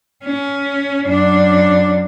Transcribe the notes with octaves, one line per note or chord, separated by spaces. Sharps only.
C#4
F#2 D4